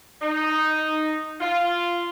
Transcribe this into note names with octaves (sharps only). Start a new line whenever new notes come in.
D#4
F4